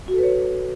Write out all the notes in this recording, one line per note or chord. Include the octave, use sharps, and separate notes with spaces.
F#4
A4
B4
C#5